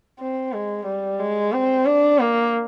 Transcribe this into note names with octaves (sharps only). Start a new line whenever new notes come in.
C4
G#3
G3
G#3
C4
D4
A#3